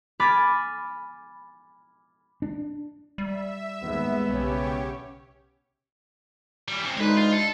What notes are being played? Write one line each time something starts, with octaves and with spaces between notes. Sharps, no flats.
G#5 B5 D6 F6 A6
D4
G3 E5
D#2 G#2 G#3 B3
B1 C#3 C#4 G4 C#5
E3 G3
C#3 C4
D2 G#3 D#4 B4 C#5
F4
A4